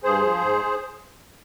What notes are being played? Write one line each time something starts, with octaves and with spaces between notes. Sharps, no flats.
G2 G#4 C5
F3
G#2